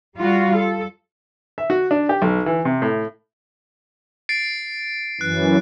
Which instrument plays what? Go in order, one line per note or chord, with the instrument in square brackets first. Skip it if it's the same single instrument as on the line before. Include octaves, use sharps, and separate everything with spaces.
[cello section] G3 F4 F#4
A4
[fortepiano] E5
F#4
D4
G4
B1
E3
C3
A2
[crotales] A6 C7 D7
[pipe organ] F#2 E3 [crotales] F#6